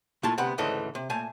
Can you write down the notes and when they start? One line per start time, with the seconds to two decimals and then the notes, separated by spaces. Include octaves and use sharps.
0.23 A#2 A3 E4 F4 A5 C6
0.38 D2 C3 B3 F#5 B5
0.58 D2 G#2 C#3 E3 A4 D#5
0.95 C3
1.10 A#2 A3 G#5 A5